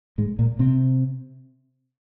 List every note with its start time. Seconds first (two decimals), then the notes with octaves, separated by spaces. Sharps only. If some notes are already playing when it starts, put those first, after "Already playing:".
0.18 G#2 G#3
0.39 A#2 A#3
0.59 C3 C4